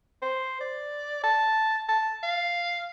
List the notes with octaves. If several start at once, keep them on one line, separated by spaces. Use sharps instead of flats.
C5
D5
A5
A5
F5